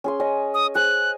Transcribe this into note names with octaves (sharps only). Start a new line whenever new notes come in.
C#4 G#4 C6
C#4 D#5
D#6
G#4 C5 F#6